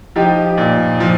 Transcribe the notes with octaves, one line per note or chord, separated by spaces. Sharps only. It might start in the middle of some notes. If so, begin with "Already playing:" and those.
F3 D#4 G4
A#2
F3